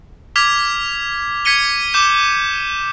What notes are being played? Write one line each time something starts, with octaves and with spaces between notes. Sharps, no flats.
D6 F6 G#6 B6 F7
G#6 B6 C#7 D#7 G7
D6 G6 E7